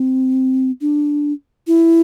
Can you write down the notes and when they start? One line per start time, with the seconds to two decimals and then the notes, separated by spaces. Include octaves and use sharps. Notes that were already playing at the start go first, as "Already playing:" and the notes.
Already playing: C4
0.81 D4
1.67 E4